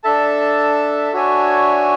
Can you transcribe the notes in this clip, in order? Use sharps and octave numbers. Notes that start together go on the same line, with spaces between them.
D4 A4 E5 A5
D4 F#4 C#5 E5 G#5